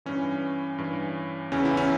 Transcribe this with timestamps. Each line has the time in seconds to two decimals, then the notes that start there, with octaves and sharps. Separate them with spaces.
0.06 G2 E3 C#4
0.78 G2 E3
1.52 E2 C#3 E3 C#4
1.65 E4
1.77 C#4